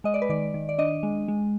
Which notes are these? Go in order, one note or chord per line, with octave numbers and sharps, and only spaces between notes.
G#3 D#5
D5
B4
D#3 D5
D#3
D5
D4 D#5
G#3
G#3